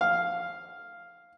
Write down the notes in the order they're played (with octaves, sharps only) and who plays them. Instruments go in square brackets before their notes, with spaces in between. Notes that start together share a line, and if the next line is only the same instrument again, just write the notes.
[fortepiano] F5